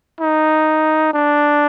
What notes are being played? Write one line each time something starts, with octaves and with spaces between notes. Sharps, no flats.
D#4
D4